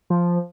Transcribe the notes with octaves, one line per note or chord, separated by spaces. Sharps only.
F3